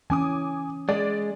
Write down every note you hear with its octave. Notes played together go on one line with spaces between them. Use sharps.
E3 C#4 G#5 D6 D#6
G#3 D5